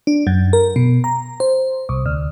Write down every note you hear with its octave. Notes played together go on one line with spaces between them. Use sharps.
D4
F#2
A#4
B2
A#5
C5
C2
D2